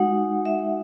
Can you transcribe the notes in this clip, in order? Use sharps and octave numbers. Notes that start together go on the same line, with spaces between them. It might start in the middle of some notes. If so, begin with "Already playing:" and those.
Already playing: G#3 D#4 F#4 F#5
E5